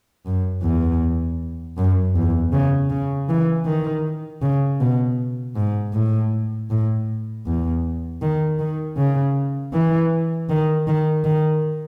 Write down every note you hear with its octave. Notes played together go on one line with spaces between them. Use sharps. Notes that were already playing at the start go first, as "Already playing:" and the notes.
F#2
E2
F#2
E2
C#3
C#3
E3
D#3
C#3
B2
G#2
A2
A2
E2
D#3
D#3
C#3
E3
D#3
D#3
D#3